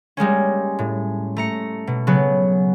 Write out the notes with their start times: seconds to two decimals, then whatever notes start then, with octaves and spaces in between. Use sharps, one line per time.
0.17 G3 G#3 A#3 C#4
0.79 A2
1.36 A3 A#5 C#7
1.87 B2
2.07 C#3 F#3 B3